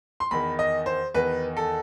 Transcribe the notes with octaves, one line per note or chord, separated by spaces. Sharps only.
C6
E2 D#3 B5
D#5
C5
E2 D#3 B4
A4